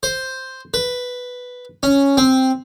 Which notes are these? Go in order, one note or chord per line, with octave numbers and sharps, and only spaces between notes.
C5
B4
C#4
C4